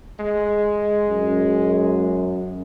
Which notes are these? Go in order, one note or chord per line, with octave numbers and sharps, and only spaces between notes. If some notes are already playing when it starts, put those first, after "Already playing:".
G#3
F#2